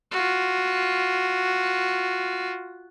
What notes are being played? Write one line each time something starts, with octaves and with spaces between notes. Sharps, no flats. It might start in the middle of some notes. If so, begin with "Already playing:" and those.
F4 F#4